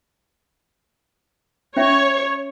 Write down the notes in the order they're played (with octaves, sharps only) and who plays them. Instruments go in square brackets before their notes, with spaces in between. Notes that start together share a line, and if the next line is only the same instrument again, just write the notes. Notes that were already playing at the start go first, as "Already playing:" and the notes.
[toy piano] C#4 E5 [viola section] C#5